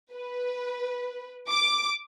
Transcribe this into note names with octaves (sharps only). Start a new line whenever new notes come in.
B4
D6